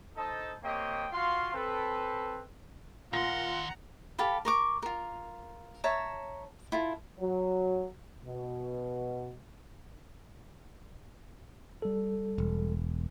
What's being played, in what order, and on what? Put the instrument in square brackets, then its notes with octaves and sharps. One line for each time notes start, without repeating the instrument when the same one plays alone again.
[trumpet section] D#4 A4 C5 D#5 A5
A#3 C4 G4 C#5 D#5 G5
F4 F#4 F5 C6
C4 A4 B4
[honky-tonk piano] A#2 A#6 [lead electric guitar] D#3 C6 [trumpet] F4 [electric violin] F#5 A#5
[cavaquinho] G4 A4 F5 B5
A#4 C#6 D6
F4 A#4
C#5 E5 A5 A#5
E4 F4 A4
[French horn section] F#3
B2
[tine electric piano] G3 A4
[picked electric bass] E1